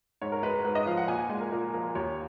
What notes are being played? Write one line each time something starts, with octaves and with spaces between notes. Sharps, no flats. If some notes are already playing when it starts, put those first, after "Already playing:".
G#2 C#5
A#4
G#3 B4
B4
G#2 B4
D#5
F3 F5
F#5
A#2 G#5
G#5
G#3 G#5
A#4
A#2 A#4
F3 A#4
D#2 C#5